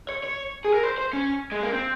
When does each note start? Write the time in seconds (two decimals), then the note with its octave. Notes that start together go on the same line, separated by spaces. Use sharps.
0.09 C#5
0.23 C#5
0.65 G#4
0.74 A#4
0.83 C5
0.98 C5
1.13 C#4
1.52 G#3
1.63 A#3
1.73 C4